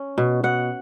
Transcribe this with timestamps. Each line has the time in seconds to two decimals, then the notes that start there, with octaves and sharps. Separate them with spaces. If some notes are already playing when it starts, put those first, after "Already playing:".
Already playing: C#4
0.18 B2
0.44 B2 F#5